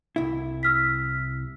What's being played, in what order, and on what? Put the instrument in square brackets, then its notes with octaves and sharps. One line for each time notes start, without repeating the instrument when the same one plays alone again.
[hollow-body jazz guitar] C2 E4
[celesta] E6 F6 B6